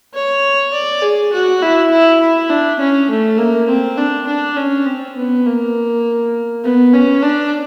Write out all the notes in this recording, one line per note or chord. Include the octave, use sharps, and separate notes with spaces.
C#5
D5
G#4
F#4
E4
E4
E4
D4
C#4
A3
A#3
C4
D4
D4
C#4
C4
B3
A#3
B3
C#4
D4